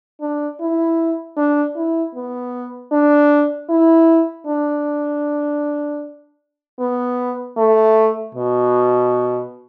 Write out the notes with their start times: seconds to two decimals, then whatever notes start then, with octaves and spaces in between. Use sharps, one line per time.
0.21 D4
0.60 E4
1.37 D4
1.76 E4
2.15 B3
2.92 D4
3.69 E4
4.47 D4
6.80 B3
7.57 A3
8.35 B2